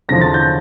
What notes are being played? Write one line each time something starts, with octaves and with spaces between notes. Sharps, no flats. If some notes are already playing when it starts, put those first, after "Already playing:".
E2 D3 F3 A#6
A6
G6